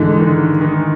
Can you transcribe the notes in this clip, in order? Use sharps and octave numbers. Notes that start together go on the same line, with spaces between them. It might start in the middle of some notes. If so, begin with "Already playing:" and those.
Already playing: G#2 D3 E3 G#3
D#3
D#3